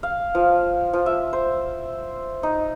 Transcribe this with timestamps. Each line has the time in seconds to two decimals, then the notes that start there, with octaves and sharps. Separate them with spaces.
0.03 F5
0.35 F3
0.93 F3
1.06 E5
1.33 C5
2.43 D#4